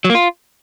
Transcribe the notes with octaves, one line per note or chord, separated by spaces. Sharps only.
F#3
A#3
F4